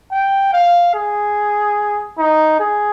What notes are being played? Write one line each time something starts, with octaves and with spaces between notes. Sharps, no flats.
G5
F5
G#4
D#4
G#4